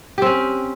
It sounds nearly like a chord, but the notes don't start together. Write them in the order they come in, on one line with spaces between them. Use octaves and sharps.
G4 C4 C#4